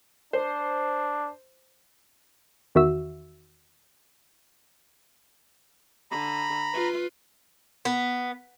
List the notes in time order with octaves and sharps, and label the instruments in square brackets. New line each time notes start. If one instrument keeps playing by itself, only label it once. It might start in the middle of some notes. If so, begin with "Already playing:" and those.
[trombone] D4 [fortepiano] C5
[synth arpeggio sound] E2 D#3 F#4 E5 E6
[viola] D3 [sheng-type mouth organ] A#5 B5
[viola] F4 B4
[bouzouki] B3